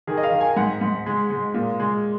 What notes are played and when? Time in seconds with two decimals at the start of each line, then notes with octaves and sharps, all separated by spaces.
0.07 D#3 G#4
0.17 D#5
0.23 F5
0.32 D#3
0.41 G#5
0.56 G#2 F#5
0.81 G#2
1.06 G#3
1.30 G#3
1.54 A#2
1.80 G#3